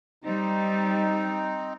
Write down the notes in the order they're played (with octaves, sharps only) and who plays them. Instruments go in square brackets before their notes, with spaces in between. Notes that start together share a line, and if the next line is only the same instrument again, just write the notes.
[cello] G3 [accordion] C4 D#4